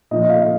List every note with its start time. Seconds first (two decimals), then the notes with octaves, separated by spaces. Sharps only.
0.11 A#2 F3 D#5
0.22 D#5
0.29 F5
0.42 F5